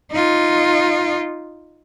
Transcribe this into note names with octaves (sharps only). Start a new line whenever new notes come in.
D#4 F4